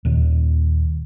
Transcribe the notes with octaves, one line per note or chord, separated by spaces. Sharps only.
D#2 A#2 D#3